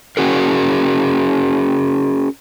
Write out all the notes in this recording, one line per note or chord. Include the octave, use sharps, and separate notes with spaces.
C#4 F#4 G#4 A#4